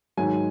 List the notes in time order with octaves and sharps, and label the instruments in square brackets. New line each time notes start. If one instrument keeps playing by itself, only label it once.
[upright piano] G#2 D#3 F#3 G#5